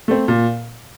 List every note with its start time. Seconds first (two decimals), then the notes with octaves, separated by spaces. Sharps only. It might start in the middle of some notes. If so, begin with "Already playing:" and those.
0.08 A3 C4
0.28 A#2